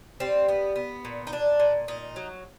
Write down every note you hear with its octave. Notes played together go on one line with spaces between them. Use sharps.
G3 C4
B3
B3
A#2
D#4
A#2 D4
A#2
A#2 D#4
F#3